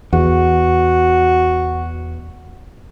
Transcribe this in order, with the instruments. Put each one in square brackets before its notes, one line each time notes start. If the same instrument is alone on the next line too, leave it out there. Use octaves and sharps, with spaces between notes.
[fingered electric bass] E2 [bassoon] F#4